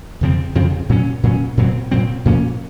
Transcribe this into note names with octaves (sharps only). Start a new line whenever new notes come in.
F2 C#3 F3 C4
F2 C#3 F3 C4
A#2 F#3 C#4
A#2 F#3 C#4
A#2 F#3 C4
A#2 F#3 C4
A#2 F3 A#3 C#4